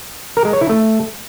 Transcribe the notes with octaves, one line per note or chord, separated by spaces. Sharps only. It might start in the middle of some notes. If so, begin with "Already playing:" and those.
A#4
G#3
C#5
E4
A3